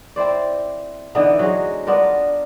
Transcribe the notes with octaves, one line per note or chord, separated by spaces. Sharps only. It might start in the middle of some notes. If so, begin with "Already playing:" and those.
C4 E4 C5 D5
D3 E3 B3 D#4
F#3 G#3
B3 D4 F4 A#4